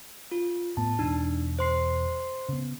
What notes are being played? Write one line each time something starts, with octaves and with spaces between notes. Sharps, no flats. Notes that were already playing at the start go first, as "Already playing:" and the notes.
F4
A2 B3 A5
E1 D4 D#4
C5 C6 C7
C#3 B3